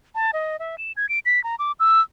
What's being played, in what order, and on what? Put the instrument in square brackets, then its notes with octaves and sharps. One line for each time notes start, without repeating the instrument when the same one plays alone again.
[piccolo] A5
D#5
E5
E7
G#6
D7
B6
A#5
D6
E6